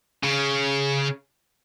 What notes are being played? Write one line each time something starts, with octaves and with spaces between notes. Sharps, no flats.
C#3